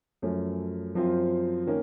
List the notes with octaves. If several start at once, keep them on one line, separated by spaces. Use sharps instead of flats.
F#2 F3 A3 C#4
F#2 F3 C4 F4
D#3 A#3 C#4